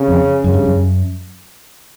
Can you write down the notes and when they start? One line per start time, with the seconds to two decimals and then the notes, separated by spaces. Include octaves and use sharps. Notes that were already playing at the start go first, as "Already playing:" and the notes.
Already playing: C#3
0.08 F2
0.44 F#2 C#3
0.54 G2
0.65 F#2